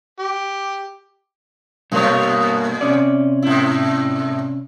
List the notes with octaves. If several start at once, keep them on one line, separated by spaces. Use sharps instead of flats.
G4
G2 A#2 A3 A#3 C#5
C3 C#4 D5
G#2 E4